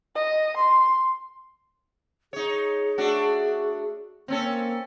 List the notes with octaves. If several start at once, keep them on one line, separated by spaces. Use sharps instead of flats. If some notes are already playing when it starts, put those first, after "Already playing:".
D#5
C6
D#4 G#4 C#5
A3 D4 F#4
A#3 C4 C#4 A4